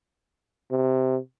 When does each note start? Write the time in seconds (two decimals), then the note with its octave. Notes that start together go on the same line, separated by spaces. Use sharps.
0.71 C3